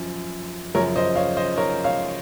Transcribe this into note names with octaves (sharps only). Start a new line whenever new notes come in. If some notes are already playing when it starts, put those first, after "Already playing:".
Already playing: F#2 F3
F#2 C#3 F3 A#4 C#5
C5 D#5
C#5 F5
C5 D#5
A#4 C#5
C#5 F5